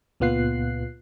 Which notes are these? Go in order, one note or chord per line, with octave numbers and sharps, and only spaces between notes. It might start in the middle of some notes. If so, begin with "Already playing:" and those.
C#2 A#2 B3 F4 F#6 C7